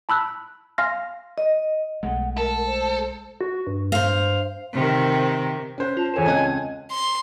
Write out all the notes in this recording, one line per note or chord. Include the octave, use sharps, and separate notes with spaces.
A5 B5 E6 F#6
F5 G#5 C6 F6 A#6
D#5
B1 G#3 A3 F#5
A4 A#4
C5
F#4
G2
C5 F5
C3 D#3
C#4 C5 F#6
F4 A5
E2 A4 C5 C#5 G#5 E7
C#2 C4 D#5 A5 F#6
C6